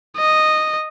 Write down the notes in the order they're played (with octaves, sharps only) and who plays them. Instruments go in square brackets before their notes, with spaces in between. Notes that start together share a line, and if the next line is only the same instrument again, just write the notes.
[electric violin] D#5